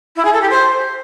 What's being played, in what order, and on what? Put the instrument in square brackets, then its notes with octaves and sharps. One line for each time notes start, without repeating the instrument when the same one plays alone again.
[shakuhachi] E4
G#4
A4
G4
C5